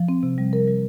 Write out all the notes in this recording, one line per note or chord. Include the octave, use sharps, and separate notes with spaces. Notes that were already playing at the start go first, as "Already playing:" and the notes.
Already playing: F3
C4
C3
G3
A#4
G3